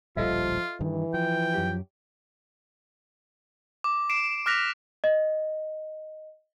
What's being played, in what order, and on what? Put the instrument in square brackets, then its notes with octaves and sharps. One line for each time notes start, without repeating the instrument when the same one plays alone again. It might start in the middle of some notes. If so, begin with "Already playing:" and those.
[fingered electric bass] D1 A#1 G3 [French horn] F3 [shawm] F4 [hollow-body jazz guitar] A4 D#5 E5
[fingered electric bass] G2 D#3 [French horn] E3
[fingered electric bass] F3 [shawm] G5
[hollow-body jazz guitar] F#2 G4
[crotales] D6
C7 D7 E7
D6 F6 F#6 A#6 B6 F7
[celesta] D#5